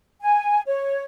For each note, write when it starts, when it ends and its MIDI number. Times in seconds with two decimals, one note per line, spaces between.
0.22 0.62 80
0.66 1.04 73